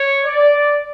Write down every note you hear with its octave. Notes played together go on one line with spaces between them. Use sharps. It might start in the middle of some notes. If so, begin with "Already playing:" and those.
Already playing: C#5
D5